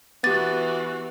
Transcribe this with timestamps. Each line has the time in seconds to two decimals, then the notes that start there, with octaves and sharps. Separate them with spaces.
0.24 E3 B3 F#4 G4 D6 A6